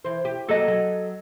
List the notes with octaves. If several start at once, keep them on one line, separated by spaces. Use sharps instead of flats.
E3 C5
G4
F#2 F#3 A#3 A4 D#5
F#3